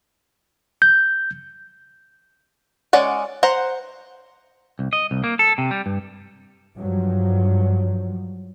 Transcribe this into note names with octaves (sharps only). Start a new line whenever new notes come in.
G6
G#3 C#4 D5 F#5
C5 F#5 A#5
C2
D#5
C2
A#3
A4
C3
G3
G2
G2 F3 F#3